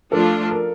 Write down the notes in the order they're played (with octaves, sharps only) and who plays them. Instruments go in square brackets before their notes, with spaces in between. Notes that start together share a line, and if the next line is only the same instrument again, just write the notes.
[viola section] F3 A3 D4 F4 [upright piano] A4
[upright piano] A#4